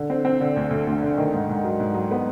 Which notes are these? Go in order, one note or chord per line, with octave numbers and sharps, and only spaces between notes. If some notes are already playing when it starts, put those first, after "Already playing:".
Already playing: D3
C4
C4
D3
D2
D2
D2
D3
D#3
G#2
G#2
F#3
G#2
F#3
B3